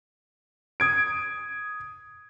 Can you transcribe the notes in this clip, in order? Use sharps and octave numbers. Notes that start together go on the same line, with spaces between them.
D#6 G#6 D7